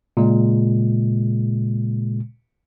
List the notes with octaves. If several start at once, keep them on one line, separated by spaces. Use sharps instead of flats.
A#2 C#3 G#3